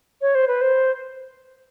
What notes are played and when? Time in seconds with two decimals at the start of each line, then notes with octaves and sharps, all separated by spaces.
0.22 C#5
0.35 C5
0.48 B4
0.61 C5